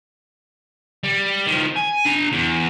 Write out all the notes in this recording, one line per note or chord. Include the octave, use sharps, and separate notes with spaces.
G3
D#3 F3
G#5
D4 A#5
E2